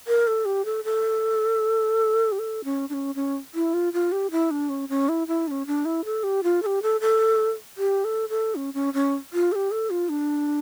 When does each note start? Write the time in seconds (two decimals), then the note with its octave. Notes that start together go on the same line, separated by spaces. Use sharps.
0.08 A#4
0.27 A4
0.45 G4
0.65 A4
0.84 A4
2.32 G4
2.39 A4
2.64 C#4
2.90 D4
2.93 C#4
3.15 C#4
3.55 E4
3.74 F4
3.93 F4
4.12 G4
4.31 E4
4.51 D4
4.69 C#4
4.89 C#4
5.09 E4
5.28 E4
5.48 D4
5.51 C#4
5.67 D4
5.85 E4
6.05 A4
6.24 G4
6.43 F4
6.62 A4
6.66 G4
6.83 A4
7.01 A4
7.78 G4
8.05 A4
8.30 A4
8.55 C#4
8.74 C#4
8.94 C#4
9.33 F4
9.52 A4
9.55 G4
9.71 A4
9.90 F4
10.09 D4